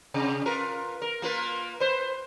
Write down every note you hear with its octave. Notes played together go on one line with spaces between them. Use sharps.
C3
F4 A#4 B4
A#4
A#3 F4 B4
B4 C5